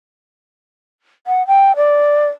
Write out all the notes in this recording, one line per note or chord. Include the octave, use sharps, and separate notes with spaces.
F#5
G5
D5